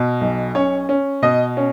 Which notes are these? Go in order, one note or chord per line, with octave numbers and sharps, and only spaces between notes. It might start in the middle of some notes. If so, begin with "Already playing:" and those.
Already playing: B2
B1
C#4 C#5
C#4
B2 D#5
C#4